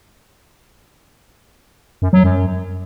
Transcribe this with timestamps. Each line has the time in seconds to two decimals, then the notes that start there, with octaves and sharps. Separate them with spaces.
2.02 F#2
2.13 F#3
2.24 F#2